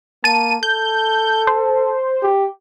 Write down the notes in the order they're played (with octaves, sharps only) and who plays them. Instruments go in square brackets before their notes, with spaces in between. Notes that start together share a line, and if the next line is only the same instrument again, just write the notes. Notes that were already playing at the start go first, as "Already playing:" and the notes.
[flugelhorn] A#3 [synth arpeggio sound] A5 D#7
[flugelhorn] A4 [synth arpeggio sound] G6
[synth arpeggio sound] C5
[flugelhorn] G4